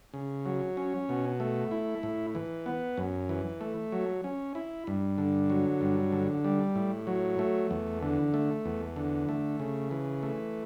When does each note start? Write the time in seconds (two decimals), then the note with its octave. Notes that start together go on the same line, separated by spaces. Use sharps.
0.14 C#3
0.46 F#3
0.77 C#4
1.09 B2
1.40 A3
1.71 E4
2.03 A2
2.35 E3
2.66 B3
2.97 F#2
3.29 E3
3.61 A3
3.92 F#3
4.24 C#4
4.55 E4
4.87 G2
5.18 D3
5.50 F#3
5.81 G2
6.12 D3
6.44 G3
6.75 A2
7.07 F#3
7.39 A3
7.71 E2
8.03 D3
8.34 A3
8.65 E2
8.96 D3
9.29 A3
9.60 C#3
9.91 E3
10.23 A3